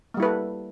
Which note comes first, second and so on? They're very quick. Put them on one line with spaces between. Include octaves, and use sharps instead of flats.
A#3 G3 E4 B4 A4